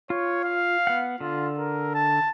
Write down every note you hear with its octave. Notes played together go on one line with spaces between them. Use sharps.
F4 C#5
F5
B3 F#5
D3 F4
A#4
A5